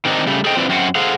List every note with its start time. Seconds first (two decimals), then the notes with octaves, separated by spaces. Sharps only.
0.05 D#3 C4 D4 D#4
0.27 C#3 G3 A3
0.45 G#4 A4 C5 D#5 G5
0.57 F3 C4 E4 B4 D5
0.69 F#2 C4 F#4
0.95 G#4 A4 C5 F5 F#5